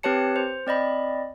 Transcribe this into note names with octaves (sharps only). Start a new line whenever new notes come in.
C4 G4 B4 C#5 A5 C#7
C5
C4 D5 D#5 B5